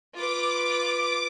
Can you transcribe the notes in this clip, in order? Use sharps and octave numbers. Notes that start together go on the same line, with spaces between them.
F4 B4 D6